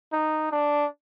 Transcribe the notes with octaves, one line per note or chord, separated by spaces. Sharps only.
D#4
D4